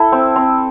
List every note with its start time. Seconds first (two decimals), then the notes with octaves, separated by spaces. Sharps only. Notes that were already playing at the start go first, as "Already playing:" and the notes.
Already playing: E4 A4
0.12 C4
0.36 C4